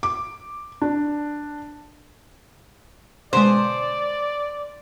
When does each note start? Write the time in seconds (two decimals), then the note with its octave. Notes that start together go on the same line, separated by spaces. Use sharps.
0.03 D6
0.82 D4
3.33 B2 D3 G#3 C5 D5